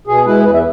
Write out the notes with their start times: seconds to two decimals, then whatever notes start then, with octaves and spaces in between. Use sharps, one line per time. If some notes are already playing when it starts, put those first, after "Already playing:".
0.07 B2 G#4
0.26 G#3 E4 B4
0.39 G#4
0.44 E2 B4
0.54 E5